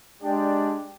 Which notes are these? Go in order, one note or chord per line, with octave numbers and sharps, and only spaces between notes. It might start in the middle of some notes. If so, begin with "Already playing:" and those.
G#3 D4 G4 D5 G5